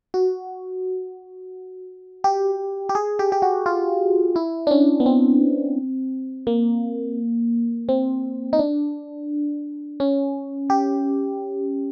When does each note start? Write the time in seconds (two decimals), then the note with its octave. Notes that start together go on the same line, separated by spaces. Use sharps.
0.14 F#4
2.24 G4
2.89 G4
2.95 G#4
3.19 G4
3.32 G4
3.42 F#4
3.66 F4
4.36 E4
4.67 D4
4.71 C#4
5.00 B3
5.06 C4
6.47 A#3
7.89 C4
8.53 D#4
8.59 D4
10.00 C#4
10.70 G4